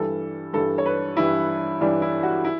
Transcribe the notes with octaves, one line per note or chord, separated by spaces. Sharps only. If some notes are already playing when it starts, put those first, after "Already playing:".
Already playing: G2 E3 G3 A4
G2 E3 G3 A4
C#5
B4
G2 E3 G3 E4
G2 E3 G3 D4
E4
F#4
E4